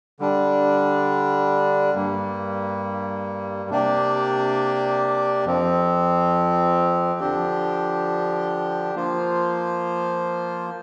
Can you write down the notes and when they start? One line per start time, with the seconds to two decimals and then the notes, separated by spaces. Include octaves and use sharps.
0.20 D3 G3 D4
1.95 G2 G3 A#3
3.70 C3 A#3 D4 G4 D5
5.45 F2 F3 C4
7.20 D3 F3 D4 G4
8.95 F3 A#3 F4 C5